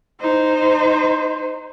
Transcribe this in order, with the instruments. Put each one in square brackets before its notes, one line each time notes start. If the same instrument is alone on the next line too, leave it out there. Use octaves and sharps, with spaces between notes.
[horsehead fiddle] D#4 C5